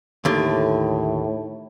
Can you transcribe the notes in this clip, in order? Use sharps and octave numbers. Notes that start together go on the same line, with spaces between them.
D#2 A2 D3